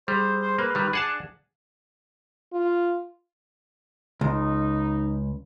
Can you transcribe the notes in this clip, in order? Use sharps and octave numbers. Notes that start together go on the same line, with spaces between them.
G3 G#4 C5
C5
A#3 B4
D#3 G3
D4 G#4 F#5 A5
F4
C#2 D#4